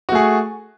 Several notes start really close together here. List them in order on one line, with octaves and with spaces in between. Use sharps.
F#4 A3 G#4